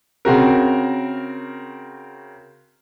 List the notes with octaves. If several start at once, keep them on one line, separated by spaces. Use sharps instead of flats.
C#3 C4 F#4 A#4